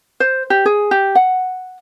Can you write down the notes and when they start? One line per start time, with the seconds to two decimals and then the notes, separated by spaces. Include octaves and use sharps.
0.20 C5
0.50 G4
0.66 G#4
0.91 G4
1.15 F#5